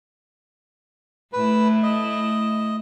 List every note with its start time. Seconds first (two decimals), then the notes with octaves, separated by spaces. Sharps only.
1.33 A2 A3 E4 B4
1.83 D#5